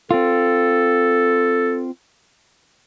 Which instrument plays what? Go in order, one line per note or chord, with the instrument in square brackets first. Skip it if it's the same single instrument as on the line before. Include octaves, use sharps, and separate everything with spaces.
[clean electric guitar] C4 F4 [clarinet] A4